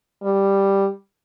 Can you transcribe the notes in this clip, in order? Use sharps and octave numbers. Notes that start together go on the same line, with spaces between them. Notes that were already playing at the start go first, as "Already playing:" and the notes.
G3